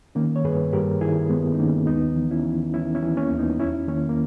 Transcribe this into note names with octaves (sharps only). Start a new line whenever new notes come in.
D#3 A#3 C#4
C#5
G2 G#4 B4
G2 G4 A#4
D#3 E4 G#4
G2 G#3 B3
D#4
D#3 A#3 C#4
D#2 B3 D#4
E3
C#4 E4
E3
E3 C#4 E4
C#4 E4
E3
A#3 C#4
D#2
B3 D#4
E2 C#4 E4
D#3 A#3 C#4
A#3